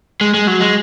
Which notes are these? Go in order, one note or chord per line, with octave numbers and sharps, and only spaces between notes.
G#3
G#3
F#3
G#3